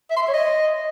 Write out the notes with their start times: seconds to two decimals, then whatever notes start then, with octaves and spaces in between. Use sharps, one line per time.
0.10 E5
0.16 C6
0.22 E5
0.28 C#5
0.34 D#5